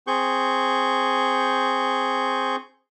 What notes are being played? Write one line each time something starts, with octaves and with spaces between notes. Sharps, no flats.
C4 G#4 C#6 G6